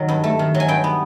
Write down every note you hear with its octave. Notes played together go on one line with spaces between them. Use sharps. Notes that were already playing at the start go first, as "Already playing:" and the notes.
Already playing: D#3 F#3
G2
A3
D#3
F#3
G#5
G2 G5
B3